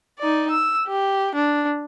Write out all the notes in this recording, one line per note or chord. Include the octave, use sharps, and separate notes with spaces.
D#4 D5
E6
G4
D4